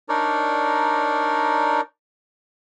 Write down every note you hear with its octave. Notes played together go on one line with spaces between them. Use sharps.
D4 D#4 A#4 C#5 D5